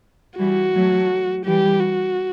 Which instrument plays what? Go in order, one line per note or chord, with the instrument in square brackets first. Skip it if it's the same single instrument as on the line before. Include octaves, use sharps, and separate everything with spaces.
[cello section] E3 G3 [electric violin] F#4
[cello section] F#3 A3
[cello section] E3 G3 [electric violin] G4
[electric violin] F#4